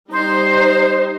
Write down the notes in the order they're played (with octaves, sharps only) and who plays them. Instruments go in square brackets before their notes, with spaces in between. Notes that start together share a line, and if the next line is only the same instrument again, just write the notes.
[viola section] G3 D#4 [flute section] C5